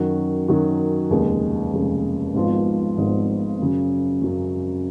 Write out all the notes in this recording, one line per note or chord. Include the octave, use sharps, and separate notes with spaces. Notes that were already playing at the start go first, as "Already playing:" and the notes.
Already playing: F#2 D#3 F#3 C#4 F#4
F#2 D#3 F#3 C#4 F#4
F1 D#2 C#3 G#3
F1 D#2 C#3 G#3
G#1 G#2 F3 B3 F4
G#1 G#2 F3 B3 F4
F#2 C#3 F#3
F#2 C#3 F#3